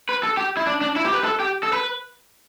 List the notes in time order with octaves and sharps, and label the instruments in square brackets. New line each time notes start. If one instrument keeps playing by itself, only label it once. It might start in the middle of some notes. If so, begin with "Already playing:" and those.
[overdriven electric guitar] B4
A4
G4
E4
D4
D4
E4
G4
B4
A4
G4
A4
B4